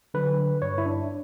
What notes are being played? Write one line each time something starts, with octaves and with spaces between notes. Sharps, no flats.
D3 F#3 B4
G2 C#5
E4
D4